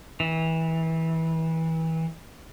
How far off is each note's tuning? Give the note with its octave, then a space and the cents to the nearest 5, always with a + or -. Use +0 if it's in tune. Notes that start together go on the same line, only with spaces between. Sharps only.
E3 -25